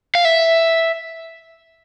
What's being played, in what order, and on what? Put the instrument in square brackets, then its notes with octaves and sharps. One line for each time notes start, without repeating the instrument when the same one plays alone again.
[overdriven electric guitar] F5
E5